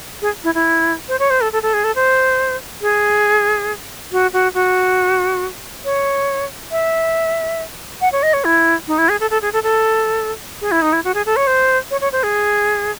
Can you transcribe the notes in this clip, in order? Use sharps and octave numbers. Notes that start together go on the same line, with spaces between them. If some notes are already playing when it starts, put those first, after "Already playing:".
G#4
E4
E4
C5
C#5
C5
A4
A4
A4
G#4
A4
C5
G#4
F#4
F#4
F#4
C#5
E5
F#5
C#5
D#5
C#5
E4
D#4
E4
G#4
A4
A4
G#4
A4
A4
G#4
E4
D#4
E4
F#4
G#4
A4
C#5
C5
C#5
C#5
C5
G#4